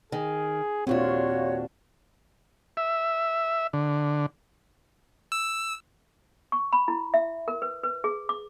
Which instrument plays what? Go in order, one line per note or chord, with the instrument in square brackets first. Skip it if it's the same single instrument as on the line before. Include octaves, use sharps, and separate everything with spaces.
[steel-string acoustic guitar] D#3 [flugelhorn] G#4
[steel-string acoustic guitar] D#2 A#2 D4 [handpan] C4 F4 [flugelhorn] F#4 [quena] C#5
[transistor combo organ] E5
D3
[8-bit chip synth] E6
[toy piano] C#6
B5
E4
E5
A#4
B4
B4
G#4
D6